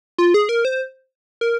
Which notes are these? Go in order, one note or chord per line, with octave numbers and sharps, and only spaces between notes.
F4
G#4
A#4
C5
A#4